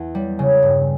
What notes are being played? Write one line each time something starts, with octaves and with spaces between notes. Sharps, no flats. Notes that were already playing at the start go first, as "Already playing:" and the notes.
Already playing: E2
G3
C#3
G2